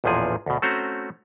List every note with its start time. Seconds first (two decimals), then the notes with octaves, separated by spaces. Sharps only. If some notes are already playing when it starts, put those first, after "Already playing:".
0.04 A1 E2 A#2 F3 G#4
0.46 D2 B2
0.62 A3 C4 C#4 F#4 C5 A#5